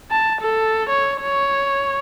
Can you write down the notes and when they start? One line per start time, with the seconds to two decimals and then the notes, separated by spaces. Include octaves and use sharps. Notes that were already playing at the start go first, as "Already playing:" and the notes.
0.11 A5
0.41 A4
0.89 C#5
1.21 C#5